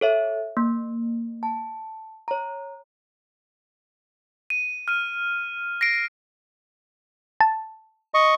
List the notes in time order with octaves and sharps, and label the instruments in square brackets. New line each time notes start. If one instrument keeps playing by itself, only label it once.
[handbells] A4 C#5 E5
A#3
A5
C#5 A#5
[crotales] D#7
F6 D#7
A#6 C7 D7
[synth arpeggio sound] A5
[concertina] D#5 C#6